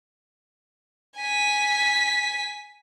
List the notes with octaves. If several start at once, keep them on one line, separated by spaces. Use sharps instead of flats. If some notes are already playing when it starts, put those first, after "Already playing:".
G#5 B6